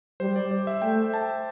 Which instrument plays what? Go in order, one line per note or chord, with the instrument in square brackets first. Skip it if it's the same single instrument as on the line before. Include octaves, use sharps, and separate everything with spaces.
[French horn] G3 [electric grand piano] C5
[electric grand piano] D5
D5
E5
[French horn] A3 [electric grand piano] G5
[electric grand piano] A5